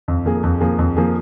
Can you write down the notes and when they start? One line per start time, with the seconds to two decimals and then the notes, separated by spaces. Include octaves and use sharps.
0.08 F2
0.25 F3 A#3 G#4
0.43 F2
0.61 F3 A#3 G#4
0.79 F2
0.97 F3 A#3 G#4